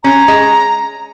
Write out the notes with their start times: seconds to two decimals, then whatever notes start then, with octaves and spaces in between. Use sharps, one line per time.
0.04 C#4 A#5
0.28 G#3